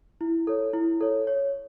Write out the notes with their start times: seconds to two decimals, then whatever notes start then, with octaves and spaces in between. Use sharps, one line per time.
0.21 E4
0.47 A4 C#5
0.74 E4
1.01 A4 C#5
1.27 C#5